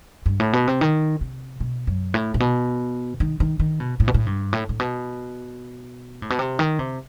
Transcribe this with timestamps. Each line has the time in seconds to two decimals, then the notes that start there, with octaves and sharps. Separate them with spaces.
0.26 G2
0.40 A2
0.53 B2
0.67 C3
0.81 D#3
1.21 C3
1.60 B2
1.87 F#2
2.14 A2
2.34 A2
2.40 B2
3.20 D#3
3.40 D#3
3.60 D#3
3.80 B2
4.00 A2
4.08 B2
4.14 A2
4.26 G2
4.53 A2
4.69 A2
4.80 B2
6.22 A2
6.30 B2
6.39 C3
6.59 D#3
6.79 C3